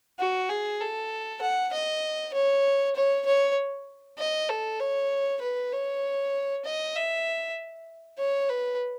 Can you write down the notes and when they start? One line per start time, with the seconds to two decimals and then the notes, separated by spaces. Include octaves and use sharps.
0.19 F#4
0.49 G#4
0.80 A4
1.42 F#5
1.73 D#5
2.34 C#5
2.96 C#5
3.26 C#5
4.19 D#5
4.49 A4
4.80 C#5
5.41 B4
5.72 C#5
6.65 D#5
6.96 E5
8.19 C#5
8.49 B4